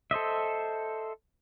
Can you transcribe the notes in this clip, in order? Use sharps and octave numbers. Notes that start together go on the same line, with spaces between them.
A4 C5 D#5 E5